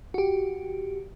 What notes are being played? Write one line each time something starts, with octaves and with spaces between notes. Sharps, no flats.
F#4 G4